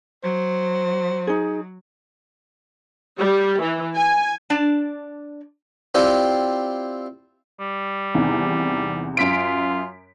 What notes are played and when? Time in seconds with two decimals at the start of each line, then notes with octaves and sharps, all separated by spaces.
0.24 F#3 C5
1.27 D#4 G#4
3.20 G3
3.62 E3
3.96 G#5
4.50 D4 D5 A5
5.95 C4 E4 F4 G4 D5
7.60 G3
8.15 E2 C3 D#3
9.17 F#2 F4 B6 D7